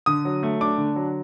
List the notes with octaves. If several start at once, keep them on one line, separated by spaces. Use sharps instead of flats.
D3 D#6
F#3
A3
D4 D6
D3
F#3